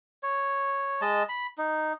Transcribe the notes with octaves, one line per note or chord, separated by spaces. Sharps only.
C#5
G#3 D#5 A5
B5
D#4